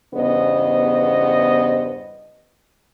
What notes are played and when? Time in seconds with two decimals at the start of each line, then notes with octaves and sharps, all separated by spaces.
0.15 E2 G2 C#3 B3 C5 D#5